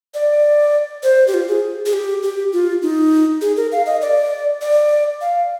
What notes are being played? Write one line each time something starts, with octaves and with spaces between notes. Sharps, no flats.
D5
C5
G4
F4
G#4
G#4
G4
G4
F4
D#4
G#4
A#4
F5
D#5
D5
D5
F5